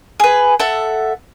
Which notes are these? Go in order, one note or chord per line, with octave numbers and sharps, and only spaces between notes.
G#4 B4
A4 E5 F#5